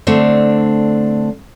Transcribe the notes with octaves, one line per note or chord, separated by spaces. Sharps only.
D3 A3 C4 D4